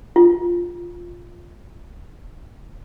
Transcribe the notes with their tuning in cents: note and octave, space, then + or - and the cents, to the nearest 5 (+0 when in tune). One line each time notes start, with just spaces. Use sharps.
F4 -10